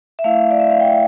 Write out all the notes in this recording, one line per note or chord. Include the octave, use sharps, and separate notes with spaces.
E5
A3 E4 F5
D5
E5
F5
G5